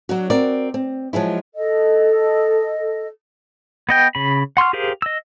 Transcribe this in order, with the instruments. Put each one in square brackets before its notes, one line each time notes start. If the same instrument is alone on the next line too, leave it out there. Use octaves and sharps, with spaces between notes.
[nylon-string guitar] F#3 D4 F#4
C4 F#4 A#4 D5
C4
F3 F#3 G#3 E4
[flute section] A4 D#5
[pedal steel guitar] B3 D#5 G5
C#3 B5
F#5 C6 C#6 F6
G4 G#4 A#4 C5 F5
D#5 E6